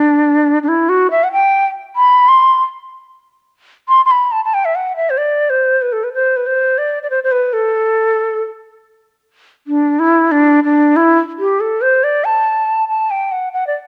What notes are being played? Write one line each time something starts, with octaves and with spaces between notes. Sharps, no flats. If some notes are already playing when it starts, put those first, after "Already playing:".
Already playing: D4
D4
E4
F#4
E5
F#5
G5
B5
C6
C6
C6
B5
A5
A5
G5
E5
F#5
E5
C5
D5
C5
B4
A4
B4
C5
B4
C5
D5
D5
C5
C5
B4
A4
D4
E4
D4
D4
E4
G4
A4
C5
D5
A5
A5
G5
F#5
F#5
D5